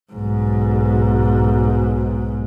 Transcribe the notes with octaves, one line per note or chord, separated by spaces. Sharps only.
B1 G#2